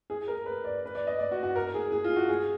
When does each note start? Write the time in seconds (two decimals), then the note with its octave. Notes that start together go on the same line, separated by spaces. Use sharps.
0.10 G#4
0.28 A#4
0.46 B4
0.65 D5
0.86 B4
0.95 D5
1.07 D#5
1.19 D5
1.31 F#4
1.43 F#4
1.55 A#4
1.74 G#4
1.92 G#4
2.04 F4
2.16 F#4
2.29 G#4